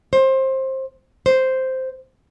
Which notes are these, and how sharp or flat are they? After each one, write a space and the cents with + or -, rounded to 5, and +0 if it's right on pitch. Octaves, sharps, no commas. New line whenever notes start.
C5 +20
C5 -5